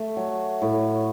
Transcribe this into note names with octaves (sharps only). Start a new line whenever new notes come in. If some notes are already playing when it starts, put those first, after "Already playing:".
Already playing: A3
F#3
A2